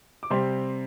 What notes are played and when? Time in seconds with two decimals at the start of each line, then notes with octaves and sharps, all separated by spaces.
0.23 D6
0.30 C3 G3 C4 C6